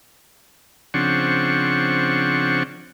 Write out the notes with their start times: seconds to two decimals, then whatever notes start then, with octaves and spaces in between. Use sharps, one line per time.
0.94 C#3 F3 C4 D4 F#5 C#6